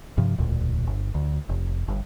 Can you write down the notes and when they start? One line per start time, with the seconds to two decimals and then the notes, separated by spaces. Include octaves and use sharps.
0.18 G2 C3 F3
0.38 E1 D2 A#2
0.87 G1
1.15 D2
1.49 F1
1.88 G1 G2